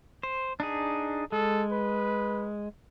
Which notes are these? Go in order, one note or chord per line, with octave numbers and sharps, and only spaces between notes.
C5
D4 D#4 G#4
G#3 A4
B4